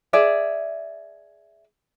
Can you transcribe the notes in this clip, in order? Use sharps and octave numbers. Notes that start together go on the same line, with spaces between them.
G#4 D5 E5